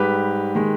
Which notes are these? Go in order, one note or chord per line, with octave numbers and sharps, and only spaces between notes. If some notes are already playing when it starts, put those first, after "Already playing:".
Already playing: G#2 G3 G4 B4
D#3 G#3